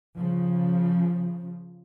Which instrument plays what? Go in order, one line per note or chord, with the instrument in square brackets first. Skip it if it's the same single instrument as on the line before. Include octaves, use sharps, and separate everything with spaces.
[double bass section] C#3 F3